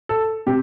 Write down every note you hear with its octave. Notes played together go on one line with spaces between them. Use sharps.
A4
C3 G4